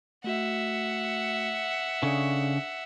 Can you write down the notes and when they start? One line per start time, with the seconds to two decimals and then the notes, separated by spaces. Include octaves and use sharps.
0.24 A3 F#4 E5 F#5
2.03 C#3 D4 A4 D5